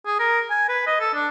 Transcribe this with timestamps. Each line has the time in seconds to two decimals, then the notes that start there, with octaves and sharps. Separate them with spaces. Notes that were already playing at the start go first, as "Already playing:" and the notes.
0.06 G#4
0.19 A#4
0.50 G#5
0.69 B4
0.87 D#5
1.00 A4
1.14 D4